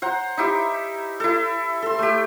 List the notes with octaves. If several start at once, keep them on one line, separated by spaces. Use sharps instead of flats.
C5 F#5 A#5
D#4 E4 G4
E4 A4
A4 C6
A3 G4